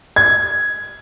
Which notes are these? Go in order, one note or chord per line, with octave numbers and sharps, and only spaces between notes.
G#6